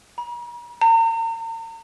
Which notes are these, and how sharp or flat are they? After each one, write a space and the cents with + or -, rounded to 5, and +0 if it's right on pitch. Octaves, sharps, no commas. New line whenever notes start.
A#5 +45
A#5 -40